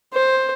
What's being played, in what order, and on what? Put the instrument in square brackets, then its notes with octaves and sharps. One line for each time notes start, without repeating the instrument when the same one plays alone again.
[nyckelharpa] C5